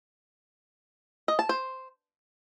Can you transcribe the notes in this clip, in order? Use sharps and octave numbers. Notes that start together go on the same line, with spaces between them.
D#5
A5
C5